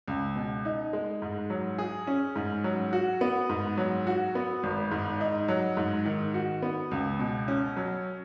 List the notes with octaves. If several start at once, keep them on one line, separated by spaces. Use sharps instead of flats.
C#2
B2
D#4
G#3
G#2
F#3
G#4
C#4
G#2
F#3
F#4
B3
G#2
F#3
F#4
B3
G#1
G#2
D#4
F#3
G#2
D#3
F#4
B3
C#2
B2
C#4
F#3